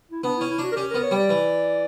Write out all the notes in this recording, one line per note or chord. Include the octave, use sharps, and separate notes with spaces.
E4
B3 D4
E4
C#4
E4
D4 F#4
A#4
C#4 G4
B3 A#4
C#5
G3 D5
E3